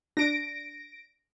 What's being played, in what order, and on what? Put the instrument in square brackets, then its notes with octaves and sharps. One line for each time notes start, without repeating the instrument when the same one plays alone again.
[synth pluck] D4 [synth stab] A#6 D7